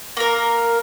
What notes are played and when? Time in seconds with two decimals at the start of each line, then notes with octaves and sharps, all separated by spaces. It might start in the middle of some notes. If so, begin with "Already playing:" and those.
0.17 A#3 A#4